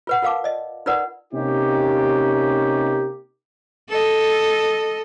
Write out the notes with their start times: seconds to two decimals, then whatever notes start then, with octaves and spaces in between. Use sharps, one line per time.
0.07 F4 B4 F#5
0.22 F4 A#4 F5 A5 D6
0.44 D5 D#5
0.86 D#4 F4 A#4 B4 D5 F#5
1.32 C3 A#3 C#4 D#4 G4
3.89 A4 D#5